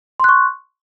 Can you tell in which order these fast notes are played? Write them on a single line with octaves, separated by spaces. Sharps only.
C6 F#6 C#6